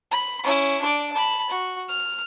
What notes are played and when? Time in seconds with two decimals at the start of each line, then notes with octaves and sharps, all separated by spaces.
0.11 B5
0.44 C#4 E4
0.81 D4 D5
1.13 A5 B5
1.50 F#4
1.89 F6